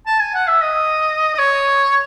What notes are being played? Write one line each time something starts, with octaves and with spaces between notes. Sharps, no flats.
A5
G#5
F#5
E5
D#5
D#5
C#5